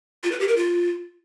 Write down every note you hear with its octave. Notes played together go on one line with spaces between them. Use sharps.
F4
B4
G4
A#4
F4